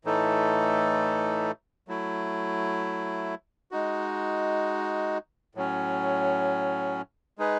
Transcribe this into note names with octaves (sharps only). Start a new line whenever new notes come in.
A2 E3 A3 D#4 A4
F#3 A3 E4
G#3 D#4 F#4
A2 F#3 C#4
G#3 D#4 G#4 B4